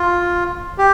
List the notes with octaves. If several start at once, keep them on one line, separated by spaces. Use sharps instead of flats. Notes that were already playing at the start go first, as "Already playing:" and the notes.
Already playing: F4
G4